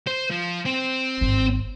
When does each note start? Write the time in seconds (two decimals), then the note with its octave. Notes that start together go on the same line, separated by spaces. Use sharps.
0.07 C5
0.30 F3
0.66 C4 C5
1.21 G#1 G2